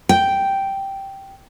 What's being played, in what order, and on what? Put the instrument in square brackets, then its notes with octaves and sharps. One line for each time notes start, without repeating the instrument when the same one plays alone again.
[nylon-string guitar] G5